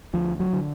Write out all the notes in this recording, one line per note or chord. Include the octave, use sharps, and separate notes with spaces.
D2 F3
F#3
D3